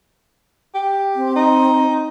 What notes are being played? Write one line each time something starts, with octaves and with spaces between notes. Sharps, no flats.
G4
C4
D#4